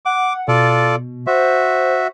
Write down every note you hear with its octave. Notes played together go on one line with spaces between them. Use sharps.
F#5 D6
B2 F4 A4 D5
F#4 C5 E5